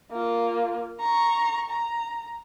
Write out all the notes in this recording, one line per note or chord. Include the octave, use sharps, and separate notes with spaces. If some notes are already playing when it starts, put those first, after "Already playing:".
A#3 F4
A#5 C#6
A#5